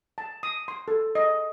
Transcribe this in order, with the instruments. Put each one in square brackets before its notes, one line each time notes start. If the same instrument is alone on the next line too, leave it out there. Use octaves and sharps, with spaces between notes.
[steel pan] A5
D#6
C6
A4
D#5